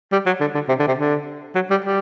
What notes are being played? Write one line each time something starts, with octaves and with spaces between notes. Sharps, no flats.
G3
F#3
D3
D3
C3
D3
C3
D3
F#3
G3
G3